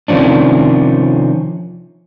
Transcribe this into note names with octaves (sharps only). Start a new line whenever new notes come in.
C3 D#3 F3 C#4 D4